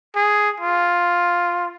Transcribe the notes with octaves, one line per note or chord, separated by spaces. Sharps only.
G#4
F4